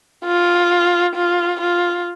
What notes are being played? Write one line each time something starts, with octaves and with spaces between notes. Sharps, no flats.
F4
F4
F4